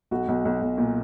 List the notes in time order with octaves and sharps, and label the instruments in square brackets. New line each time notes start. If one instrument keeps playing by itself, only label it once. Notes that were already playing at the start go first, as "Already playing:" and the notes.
[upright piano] B1 F#4
B1
B1
B1
A#2